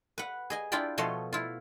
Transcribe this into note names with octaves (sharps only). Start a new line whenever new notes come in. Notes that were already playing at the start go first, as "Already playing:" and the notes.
B4 F#5
G#4 D#5 G#5
D4 E4 F4 D5 G5 B5
B2 F3 A3 C#5 D#5 C6
E4 F4